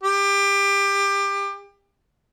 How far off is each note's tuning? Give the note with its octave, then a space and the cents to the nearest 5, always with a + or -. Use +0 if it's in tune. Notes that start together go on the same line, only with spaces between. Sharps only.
G4 +25